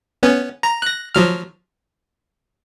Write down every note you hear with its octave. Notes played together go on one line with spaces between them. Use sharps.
B3 C#4
A#5
F#6 A#6
F3 F#3 F6